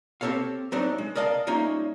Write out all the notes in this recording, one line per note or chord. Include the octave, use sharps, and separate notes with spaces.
C4 G4 A4 C#5 F5
F#3 G3 A3 C4 D4 D#4
G#3
A#4 D5 D#5 F5 A5
G3 A3 A#3 C#4 D#4 F4